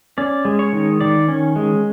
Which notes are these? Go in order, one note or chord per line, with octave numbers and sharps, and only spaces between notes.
C#4 D5
G#3
C#5
D#3
D#3 D5
C#4
G#3